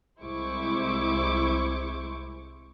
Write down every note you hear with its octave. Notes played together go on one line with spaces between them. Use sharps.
C2 G#3 E4 C5 C#6 D6